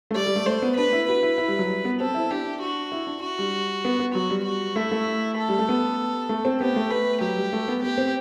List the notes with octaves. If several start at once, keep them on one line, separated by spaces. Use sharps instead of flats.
A3
G3 D5
G3
A3
A3 C5
B3
D4 B4
E4
F#4 B4
E4
E4
G3
F#3
G3
B3
C4 A4
E4
D4 G4
F#4
E4
D4
F#4
G3
B3
B3
F#3 F#4
G3
F#4
A3 E4
A3
A4
G3
A3
B3
A3
C4
B3 G4
A3
B4
F#3 G4
G3
A3
B3
B3 G4
C4